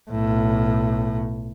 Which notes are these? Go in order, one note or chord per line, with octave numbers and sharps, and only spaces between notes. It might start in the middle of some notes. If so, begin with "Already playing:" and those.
B1 A2